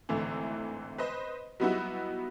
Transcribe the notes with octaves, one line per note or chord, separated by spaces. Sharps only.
G#1 A2 D3 E3
B4 C5 D#5
F#3 G3 B3 D#4 E4 F#4